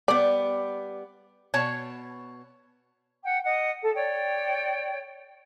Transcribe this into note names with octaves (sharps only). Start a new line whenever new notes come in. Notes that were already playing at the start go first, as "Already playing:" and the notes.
G3 B3 D5
B2 C#5 A5
F#5 G5
D#5 F#5
A4
C#5 D5 G5